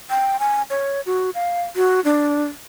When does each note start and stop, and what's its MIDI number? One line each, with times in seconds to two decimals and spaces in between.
0.10 0.37 79
0.40 0.62 80
0.70 1.01 73
1.06 1.30 66
1.35 1.62 77
1.76 2.00 66
2.05 2.44 62